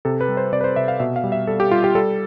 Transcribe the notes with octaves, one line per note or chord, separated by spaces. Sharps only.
C3 A4
B4
G3
C5
C3 D5
B4
C5
C3 E5
F5
B2 E5
F5
G3
E5
G3 A4
G4
G3 F4
G4
G3 A4